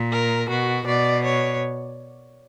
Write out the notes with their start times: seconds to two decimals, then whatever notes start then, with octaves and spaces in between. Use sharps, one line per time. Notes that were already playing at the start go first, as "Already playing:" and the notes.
Already playing: A#2
0.12 A#4
0.49 B2 F#4
0.86 B2 D5
1.25 C#5